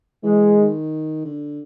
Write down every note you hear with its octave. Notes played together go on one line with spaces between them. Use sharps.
E3 G#3
D#3
D3